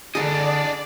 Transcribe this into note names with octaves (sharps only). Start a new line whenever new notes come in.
D3 D4 G#4 D5 D#5 F#5